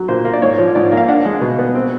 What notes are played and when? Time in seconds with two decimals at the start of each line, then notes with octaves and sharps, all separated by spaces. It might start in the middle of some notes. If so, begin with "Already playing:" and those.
Already playing: F#3
0.08 A#2 C5
0.25 A#3
0.33 D5
0.42 G#2 C#5
0.58 F3
0.75 G#2 D5
0.92 A#3
0.97 F5
1.08 D4 F#5
1.25 G#3
1.41 B2
1.59 B3
1.75 C4